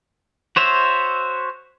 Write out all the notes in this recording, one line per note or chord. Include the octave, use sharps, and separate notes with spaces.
F#4 C5 C#5 E5